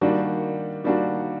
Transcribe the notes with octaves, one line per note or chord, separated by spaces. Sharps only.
D#3 G3 A#3 D4 F#4
D#3 G3 A#3 D4 F#4